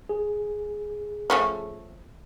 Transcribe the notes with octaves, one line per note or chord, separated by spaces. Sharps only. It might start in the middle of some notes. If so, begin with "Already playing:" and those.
G#4
F3 A3 C#4